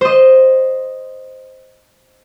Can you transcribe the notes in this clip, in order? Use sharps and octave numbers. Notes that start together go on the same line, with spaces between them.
C5 D#5